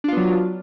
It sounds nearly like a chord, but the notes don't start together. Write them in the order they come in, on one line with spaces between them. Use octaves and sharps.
D4 F4 B3 F#3